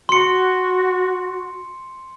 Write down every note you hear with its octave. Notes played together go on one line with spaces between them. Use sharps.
F#4 C6 C#7